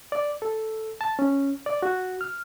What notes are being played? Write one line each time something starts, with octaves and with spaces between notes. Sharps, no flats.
D5
A4
A5
C#4
D5
F#4
F6